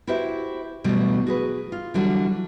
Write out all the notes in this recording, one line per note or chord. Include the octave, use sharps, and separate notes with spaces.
E4 F#4 G4 B4 C5 E5
B2 D3 E3 F#3 G3 A3
F#4 G#4 B4
F4
D3 E3 F#3 G3 D4